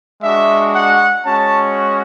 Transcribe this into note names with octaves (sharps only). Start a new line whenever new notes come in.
G#3 D4 F#4 E5
F#5
G#3 C#4 F#4 A5